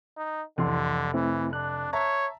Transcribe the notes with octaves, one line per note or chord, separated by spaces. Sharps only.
D#4
F1 C2 D3 E3 C6
E3 A3 C4 E4
D4 F#6
C#5 E5 A5 A#5